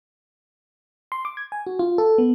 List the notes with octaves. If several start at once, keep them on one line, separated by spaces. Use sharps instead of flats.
C6
D6
G#6
G#5
F#4
F4
A4
B3